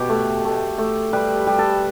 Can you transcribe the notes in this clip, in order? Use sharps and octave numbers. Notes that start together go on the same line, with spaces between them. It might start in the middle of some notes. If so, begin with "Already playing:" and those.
Already playing: B2 G4
A3
A3
A3
G3 B4
G3
A4